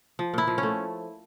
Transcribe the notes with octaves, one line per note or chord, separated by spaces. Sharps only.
F3
A#2 E4
F3
C#4
A3